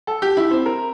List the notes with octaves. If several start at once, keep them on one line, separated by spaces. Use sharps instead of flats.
A4
G4
E4
C4
A#4